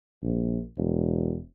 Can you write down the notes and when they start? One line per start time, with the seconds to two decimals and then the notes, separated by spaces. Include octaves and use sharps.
0.23 A#1
0.77 E1